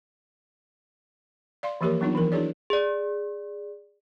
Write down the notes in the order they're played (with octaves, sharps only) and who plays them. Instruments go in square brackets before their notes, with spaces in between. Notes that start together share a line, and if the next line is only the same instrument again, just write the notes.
[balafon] D5 F5 C6
E3 F3 A#3 G4 A#4 C#5
F#3 B3 D4 D#4 F4
E3 F3 A#4
D4 E4 F#4 G#4 C#5 D5
[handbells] G#4 D5